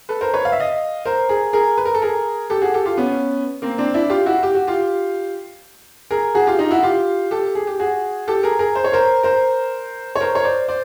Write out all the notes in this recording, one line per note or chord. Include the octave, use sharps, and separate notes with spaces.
A4 B4
A#4 C5
B4 C#5
F5
E5
D#5 F5
A#4 C5
G#4 A#4
G#4 A#4
B4
A#4
A4
G#4 A#4
G4 A4
F#4 G#4
G4 A4
F4 G4
B3 C#4
A#3 C4
C4 D4
D4 E4
F4 G4
E4 F#4
G4
F#4
F4 G4
G#4 A#4
F#4 G#4
F4 G4
D#4 F4
E4 F#4
F4 G4
G4 A4
G#4
G4
F#4 G#4
G4 A4
G#4 A#4
G#4 A#4
C5
C#5
A#4 C5
A#4 C5
C#5
A#4 C5
C#5
C5 D5
C5 D5